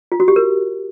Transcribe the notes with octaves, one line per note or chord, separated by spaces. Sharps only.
F4
F#4
G4
A#4